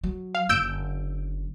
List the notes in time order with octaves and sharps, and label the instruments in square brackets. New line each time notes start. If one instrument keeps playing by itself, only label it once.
[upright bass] F#3
[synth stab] F5
[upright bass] F#1 D3 [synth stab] E6 G6 D7